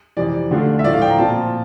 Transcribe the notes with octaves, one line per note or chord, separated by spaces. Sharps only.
F2 C3 E3 D5
D3 A3 D4 F4
E5
A2 F3 A3 E4 D5
F5
G5
A#5
A#2 F3 C4 F4 A5